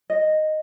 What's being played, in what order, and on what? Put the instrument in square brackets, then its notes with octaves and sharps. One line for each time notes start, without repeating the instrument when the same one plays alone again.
[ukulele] D#5